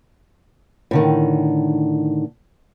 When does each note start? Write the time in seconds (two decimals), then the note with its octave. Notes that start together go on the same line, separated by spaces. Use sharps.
0.91 A2 D3 D#3